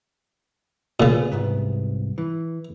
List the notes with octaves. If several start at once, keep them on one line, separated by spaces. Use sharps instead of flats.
A#2 C#3 B3 F4 G#4
C2 G#2 B3
E3